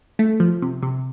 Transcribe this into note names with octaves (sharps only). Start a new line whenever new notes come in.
A3
F3
C3
C3